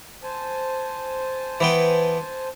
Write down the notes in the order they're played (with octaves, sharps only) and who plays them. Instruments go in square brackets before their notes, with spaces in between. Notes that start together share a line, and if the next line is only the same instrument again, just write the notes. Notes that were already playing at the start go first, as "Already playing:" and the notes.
[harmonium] C5 G#5 A5
[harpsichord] E3 B3 G5